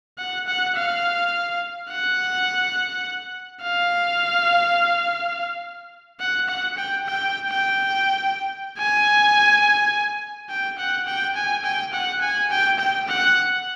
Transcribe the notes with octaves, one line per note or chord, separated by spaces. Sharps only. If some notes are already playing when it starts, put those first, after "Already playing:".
F#5
F#5
F5
F#5
F5
F#5
F#5
G5
G5
G5
G#5
G5
F#5
G5
G#5
G5
F#5
G#5
G5
G5
F#5